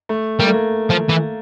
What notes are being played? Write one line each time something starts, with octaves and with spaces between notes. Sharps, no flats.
A3
G3 A#3
A3
A#3
F3
E3